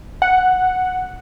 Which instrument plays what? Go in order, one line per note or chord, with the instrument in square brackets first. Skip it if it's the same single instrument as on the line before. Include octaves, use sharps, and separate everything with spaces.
[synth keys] F#5